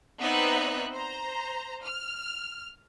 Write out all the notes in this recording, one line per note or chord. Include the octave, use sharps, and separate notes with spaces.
B3 C4 D#4 D5 E5 F#6
C5 A#5
F6